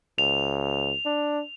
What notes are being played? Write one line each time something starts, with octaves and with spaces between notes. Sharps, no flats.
C#2 F7
D4